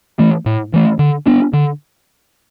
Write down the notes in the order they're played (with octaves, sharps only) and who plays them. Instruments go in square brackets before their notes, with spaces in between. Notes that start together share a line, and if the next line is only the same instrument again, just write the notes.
[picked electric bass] E3 A3
A2
E3 A3
D3
B3 D4
D3